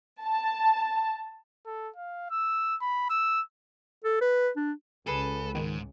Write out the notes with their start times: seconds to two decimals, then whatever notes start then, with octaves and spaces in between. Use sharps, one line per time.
0.24 A5
1.66 A4
1.96 F5
2.30 E6
2.81 B5
3.10 E6
4.05 A4
4.21 B4
4.56 D4
5.07 C#2 G#4 A4 B4
5.55 E2 G#2 D#3